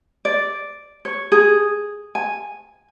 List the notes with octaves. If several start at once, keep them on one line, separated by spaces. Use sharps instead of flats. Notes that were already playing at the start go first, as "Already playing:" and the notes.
D5
C#5
G#4
G#5